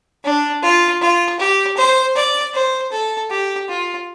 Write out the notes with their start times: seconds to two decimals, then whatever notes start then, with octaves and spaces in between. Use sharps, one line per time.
0.24 D4
0.63 F4
1.02 F4
1.40 G4
1.77 C5
2.16 D5
2.54 C5
2.92 A4
3.30 G4
3.69 F4